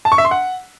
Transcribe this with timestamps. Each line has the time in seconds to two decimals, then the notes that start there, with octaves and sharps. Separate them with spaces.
0.05 A5
0.12 C#6
0.18 E5
0.25 C6
0.31 F#5